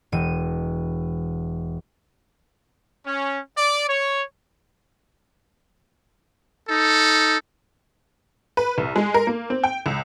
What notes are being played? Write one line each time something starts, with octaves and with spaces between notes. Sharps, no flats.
E1 D#7
C#4
D5
C#5
D#4 A4
B4
C2
G#3
A#4
A#3
C4
G5
C#2